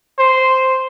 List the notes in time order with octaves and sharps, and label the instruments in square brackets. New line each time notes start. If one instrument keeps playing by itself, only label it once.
[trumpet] C5